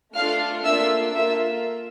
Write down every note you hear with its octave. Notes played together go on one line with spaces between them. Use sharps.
A3 D4 F4 A4 F5 F6
A#3 D4 F4 A4 E5 E6
A#3 F4 A4 E5 E6